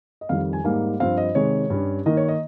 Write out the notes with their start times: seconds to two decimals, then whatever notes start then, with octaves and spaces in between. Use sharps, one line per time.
0.21 D#5
0.29 F2 D#3 G3 F5
0.53 G#5
0.64 G#2 G3 A#3 D#4 F5
1.00 G2 F3 C4 F5
1.17 D#5
1.35 C3 D#3 G#3 C#5
1.70 G2 G3 C#4
2.06 D#3 A#3 D#4 D#5
2.17 C#5
2.28 D#5